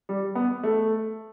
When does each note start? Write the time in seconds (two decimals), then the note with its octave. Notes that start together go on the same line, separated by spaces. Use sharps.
0.09 G3
0.35 B3
0.63 A3